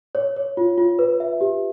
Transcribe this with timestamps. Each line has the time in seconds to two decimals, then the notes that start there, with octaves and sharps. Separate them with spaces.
0.15 C#5
0.36 C#5
0.57 F4
0.78 F4
0.99 B4
1.20 E5
1.41 G4